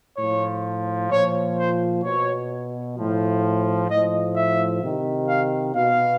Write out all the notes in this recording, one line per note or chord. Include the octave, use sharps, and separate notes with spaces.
A2 F3 C#5
A#2 F3 C#5
C5
B2 C#5
A2 F3
A2 F3 D#5
E5
C3 D#3
F5
B2 F5